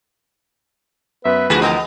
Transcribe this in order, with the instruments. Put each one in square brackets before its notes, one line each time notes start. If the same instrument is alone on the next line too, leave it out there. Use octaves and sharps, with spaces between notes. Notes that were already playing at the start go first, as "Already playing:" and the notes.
[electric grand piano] F#2 B3 [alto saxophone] B4 [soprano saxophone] E5
[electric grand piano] D2 E3 F3 [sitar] F#4 G#4 [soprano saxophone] B5
[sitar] B3 [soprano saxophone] A#4 [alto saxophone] D#5